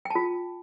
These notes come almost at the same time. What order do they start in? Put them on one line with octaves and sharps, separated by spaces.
G5 A5 F4